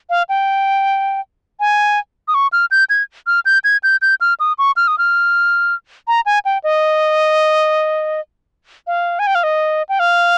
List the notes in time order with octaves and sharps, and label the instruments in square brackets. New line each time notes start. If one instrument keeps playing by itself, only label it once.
[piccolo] F5
G5
G#5
D#6
C#6
F6
G6
G#6
F6
G6
G#6
G6
G6
F6
D#6
C#6
F6
D#6
F6
A#5
G#5
G5
D#5
F5
G#5
G5
F5
D#5
G5
F5